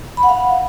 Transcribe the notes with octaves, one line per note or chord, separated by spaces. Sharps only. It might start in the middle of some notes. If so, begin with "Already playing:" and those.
B5
F#5
F5